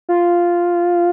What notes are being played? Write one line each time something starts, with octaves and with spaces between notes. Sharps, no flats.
F4